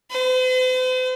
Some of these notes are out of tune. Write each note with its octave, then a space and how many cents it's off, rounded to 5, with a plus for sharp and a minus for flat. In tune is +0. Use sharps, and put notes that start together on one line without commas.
C5 -45